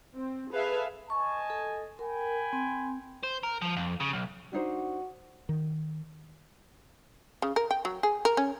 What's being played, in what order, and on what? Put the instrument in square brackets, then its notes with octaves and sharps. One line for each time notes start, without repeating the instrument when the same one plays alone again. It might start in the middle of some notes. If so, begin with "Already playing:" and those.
[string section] C4
G#4 A4 B4 E5 F5
[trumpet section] D#5 G#5 A5 [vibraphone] C#6
[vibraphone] A4
[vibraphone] A#4 [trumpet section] G5 G#5 B5
[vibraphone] C4
[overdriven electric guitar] C5
A#4
F3
F2
C#3
B1
[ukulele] D4 D#4 C5 [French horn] F#4
[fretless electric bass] D#3
[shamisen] C#3
A#4
G5
F#3
G#4
A#4
C#4